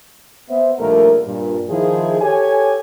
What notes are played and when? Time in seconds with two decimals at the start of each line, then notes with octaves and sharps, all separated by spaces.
0.49 B3 C5 E5
0.79 A#1 D#2 G3 A3 A#3 A#4
1.25 G2 A#2
1.69 D#3 F3 E4 G#4
2.20 G4 A4 C#5 G#5